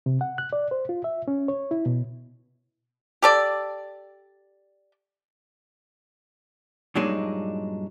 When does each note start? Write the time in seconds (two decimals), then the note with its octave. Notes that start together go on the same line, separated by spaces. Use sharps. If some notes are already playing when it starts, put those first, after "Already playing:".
0.06 C3
0.21 F#5
0.38 F#6
0.53 D5
0.71 C5
0.89 F4
1.04 E5
1.28 C#4
1.48 C#5
1.71 E4
1.86 B2
3.22 G4 A4 D5
6.95 G2 A#2 F#3 G#3 D4 D#4